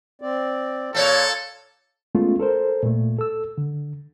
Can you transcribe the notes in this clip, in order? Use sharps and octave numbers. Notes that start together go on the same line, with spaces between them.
C4 D5
A#2 A4 C5 C#5
G#3 A3 B3 C#4 F4
A4 A#4 C5
A#2 A3
A4 E6
D3